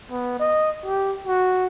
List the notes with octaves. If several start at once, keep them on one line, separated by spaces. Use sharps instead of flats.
B3
D#5
G4
F#4